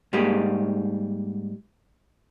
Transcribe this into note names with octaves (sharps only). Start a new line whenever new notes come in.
G#2 G3 A#3 G4 G#4